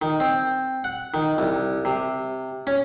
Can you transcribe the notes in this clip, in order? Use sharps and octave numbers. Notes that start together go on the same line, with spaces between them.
D#3
C4
F#5
D#3
C2
C3
C#4